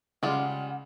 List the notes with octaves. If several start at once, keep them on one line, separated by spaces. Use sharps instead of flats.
C#3 G3 G#3 F4 F#5